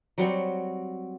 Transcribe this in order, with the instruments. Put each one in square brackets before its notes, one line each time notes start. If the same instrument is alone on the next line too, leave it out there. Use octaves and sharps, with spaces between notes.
[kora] F#3 G3 C4 F#4